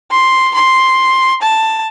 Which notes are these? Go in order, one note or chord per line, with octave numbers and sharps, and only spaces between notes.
C6
C6
A5